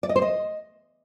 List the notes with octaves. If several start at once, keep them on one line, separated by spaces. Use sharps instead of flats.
D5
D#5
C5
D#5